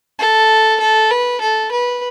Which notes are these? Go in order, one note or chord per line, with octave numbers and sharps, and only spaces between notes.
A4
A4
B4
A4
B4